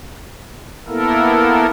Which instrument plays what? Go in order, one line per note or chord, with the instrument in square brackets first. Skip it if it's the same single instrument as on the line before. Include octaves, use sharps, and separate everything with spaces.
[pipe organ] A#3 B3 E4 A4 A#4